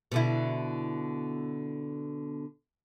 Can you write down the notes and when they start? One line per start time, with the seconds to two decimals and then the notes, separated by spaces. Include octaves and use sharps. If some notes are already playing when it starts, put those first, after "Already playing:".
0.12 B2 D3 E4